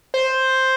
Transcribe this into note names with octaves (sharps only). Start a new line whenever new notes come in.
C5